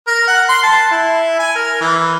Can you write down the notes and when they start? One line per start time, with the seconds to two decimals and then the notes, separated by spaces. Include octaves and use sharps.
0.07 A#4
0.27 F#5
0.49 C6
0.63 A5
0.91 E4
1.39 G#5
1.55 A#4
1.81 E3